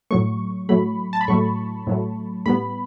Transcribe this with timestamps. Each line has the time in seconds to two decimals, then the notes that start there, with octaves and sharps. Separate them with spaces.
0.11 A2 F#3 A3 C#6
0.69 A2 F#3 A3 B5
1.13 A5
1.21 B5
1.28 A2 F#3 A3 C#6
1.87 A2 F#3 A3
2.46 A2 G3 B3 B5